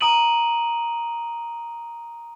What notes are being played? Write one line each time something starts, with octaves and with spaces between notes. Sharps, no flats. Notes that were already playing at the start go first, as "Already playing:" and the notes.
A#5 D#6 D7 D#7 F#7